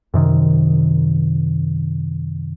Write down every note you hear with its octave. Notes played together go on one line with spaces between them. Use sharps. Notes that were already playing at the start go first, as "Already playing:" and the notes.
F#2 C3 D#3